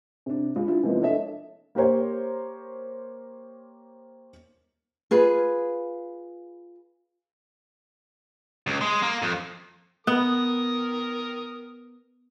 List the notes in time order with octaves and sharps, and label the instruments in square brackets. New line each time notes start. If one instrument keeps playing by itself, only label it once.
[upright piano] C3 D4
C#2
D4 E4 F4
C3 E3 F3 G#3 A#3 B3
D4 A4 C#5 D#5 E5
A#3 G4 A#4 C5 C#5
[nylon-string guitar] F4 G#4 B4
[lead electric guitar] C#2
G#3
A#3
F2
[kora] B3 [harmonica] A#4 D#6